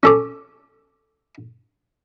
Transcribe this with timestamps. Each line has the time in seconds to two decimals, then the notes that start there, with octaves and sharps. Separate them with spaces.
0.03 C#4 A4 D6